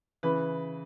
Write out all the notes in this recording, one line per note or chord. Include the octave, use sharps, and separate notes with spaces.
C#3 E3 B4